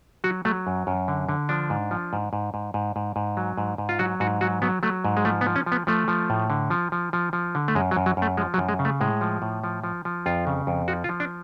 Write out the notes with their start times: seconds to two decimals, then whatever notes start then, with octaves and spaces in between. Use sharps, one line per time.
0.24 F#3 F#4
0.45 F#3 A3
0.67 F#2
0.87 F#2
1.08 D3
1.29 D3
1.49 F3 D4
1.70 G#2
1.91 F3
2.13 G#2
2.33 G#2
2.54 G#2
2.74 G#2
2.96 G#2
3.16 G#2
3.37 F#3
3.58 G#2
3.78 G#2
3.89 F4
3.99 F#3 F#4
4.20 G#2 F#4
4.41 F#3 F#4
4.62 F#3 B3
4.83 F#3 A3
5.05 G#2
5.17 G#3
5.25 F3 A3
5.41 B3
5.46 F3
5.56 C#4
5.66 F3
5.72 B3
5.87 F3 A3
6.08 F3
6.30 A2
6.50 D3
6.70 F3
6.92 F3
7.13 F3
7.33 F3
7.55 D3
7.68 A3
7.75 F#2 G#3
7.91 F#3
7.97 F#2
8.06 F#3
8.17 F#2 A3
8.37 F3 G#3
8.54 F#3
8.58 F#2
8.69 G#3
8.79 C#3
8.85 A3
9.01 A2 G#3
9.21 F3
9.42 A2
9.64 F3
9.84 F3
10.05 F3
10.26 F2 F4
10.47 C#3
10.67 F2
10.88 F3 F#4
11.04 F4
11.09 F3
11.20 D4